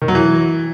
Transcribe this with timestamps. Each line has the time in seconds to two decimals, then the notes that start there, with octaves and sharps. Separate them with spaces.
0.02 D#3
0.08 F#3
0.15 E3